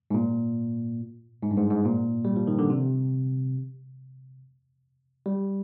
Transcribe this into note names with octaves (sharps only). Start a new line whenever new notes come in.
G#2
A#2
G#2
G2
G#2
G#2
A#2
G3
F3
D#3
D3
C3
G3